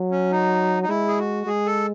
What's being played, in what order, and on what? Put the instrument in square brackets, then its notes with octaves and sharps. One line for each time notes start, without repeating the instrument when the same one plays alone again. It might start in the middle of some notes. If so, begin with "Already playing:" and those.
Already playing: [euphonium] F#3
[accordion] C#4
D#4
D#4
[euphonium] G#3 [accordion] E4
[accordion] G#4
F#4
[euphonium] G#3 [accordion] G#4
[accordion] A4